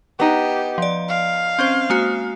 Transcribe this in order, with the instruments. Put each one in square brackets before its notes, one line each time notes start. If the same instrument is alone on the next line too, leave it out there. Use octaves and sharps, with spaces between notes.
[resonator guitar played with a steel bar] B3 D#4 [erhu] G4
[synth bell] F3 D5
[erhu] F5
[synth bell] C4 C#4 C5
G#3 A#3 F#4